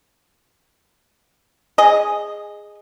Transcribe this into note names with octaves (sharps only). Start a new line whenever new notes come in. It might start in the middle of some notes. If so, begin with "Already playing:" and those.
G#4 D#5